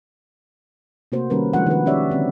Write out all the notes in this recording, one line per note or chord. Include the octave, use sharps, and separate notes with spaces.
C3 A3 A#3 F#4 C5
D#3 G3 A#3 C#4 A#4 B4
F3 G#3 D4 F#4 F#5
D#3 B4
C#4 D#4 G4 C#5 D5 E5
D3 C4